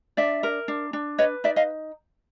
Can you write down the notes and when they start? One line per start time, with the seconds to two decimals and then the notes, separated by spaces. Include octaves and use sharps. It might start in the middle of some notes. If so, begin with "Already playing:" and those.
0.17 D4 D5 E5
0.43 A#4
0.68 D4
0.93 D4
1.18 B4 C#5 D#5
1.44 D#4 D5 E5
1.56 D#5 F5